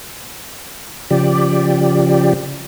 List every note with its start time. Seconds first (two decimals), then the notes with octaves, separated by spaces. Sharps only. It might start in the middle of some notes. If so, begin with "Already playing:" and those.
1.11 C#3 F3 G4 D5